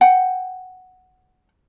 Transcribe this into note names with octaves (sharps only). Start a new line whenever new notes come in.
F#5 G5